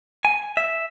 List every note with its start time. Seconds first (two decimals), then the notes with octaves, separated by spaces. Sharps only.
0.25 G#5
0.57 E5